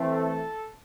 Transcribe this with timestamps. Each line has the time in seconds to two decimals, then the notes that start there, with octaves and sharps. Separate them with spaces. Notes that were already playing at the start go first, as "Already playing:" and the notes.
Already playing: E3 A3 C4
0.12 A4